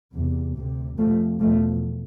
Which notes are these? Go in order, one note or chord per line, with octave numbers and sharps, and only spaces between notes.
E2 C3
D2 C3
F2 C3 F3 A3
E2 B2 F3 A3